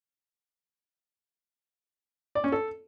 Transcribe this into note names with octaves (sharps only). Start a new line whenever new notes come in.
D5
C#4
A4